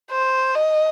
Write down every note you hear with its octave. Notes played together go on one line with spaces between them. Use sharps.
C5
D#5